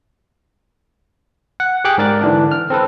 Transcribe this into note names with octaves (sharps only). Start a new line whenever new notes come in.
F#5
G4 G#4 G5 D6 F#6
G#2 A#4 D5 D6
D3 E3 D4
F6
C4 A4 B4